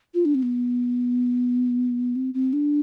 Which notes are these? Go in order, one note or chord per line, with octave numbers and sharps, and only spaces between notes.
F4
D4
C4
B3
C4
C4
D4